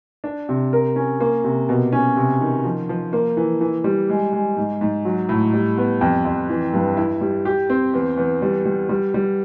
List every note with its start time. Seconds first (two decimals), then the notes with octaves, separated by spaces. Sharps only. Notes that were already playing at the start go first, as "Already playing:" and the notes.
0.24 D4
0.49 C3
0.73 A#4
0.96 C#4
1.20 A#3
1.44 C3
1.69 B2
1.93 C#4
2.16 C3
2.41 D#3
2.64 F3
2.89 F3
3.13 A#3
3.37 E3
3.61 E3
3.84 G3
4.09 G#3
4.33 G#3
4.57 G#2
4.81 G#2
5.05 F#3
5.29 A2
5.53 G3
5.77 B3
6.01 F2
6.25 F2
6.49 E3
6.73 G2
6.97 E4
7.21 G3
7.45 G4
7.70 C4
7.93 E2
8.17 E2
8.42 G3
8.65 G3
8.89 G3
9.14 G3